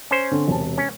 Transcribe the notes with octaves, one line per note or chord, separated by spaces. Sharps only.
C#4 C5
D3 C4
E1 C3 A5
C#4